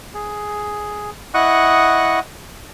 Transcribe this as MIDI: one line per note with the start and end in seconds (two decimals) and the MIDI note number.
0.14 1.10 68
1.34 2.19 64
1.34 2.19 75
1.34 2.19 78
1.34 2.19 85
1.34 2.19 87
1.34 2.19 90